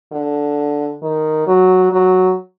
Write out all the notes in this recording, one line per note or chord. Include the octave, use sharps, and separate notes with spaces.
D3
D#3
F#3
F#3